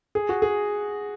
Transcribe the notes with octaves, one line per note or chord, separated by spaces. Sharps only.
G#4
F#4
G#4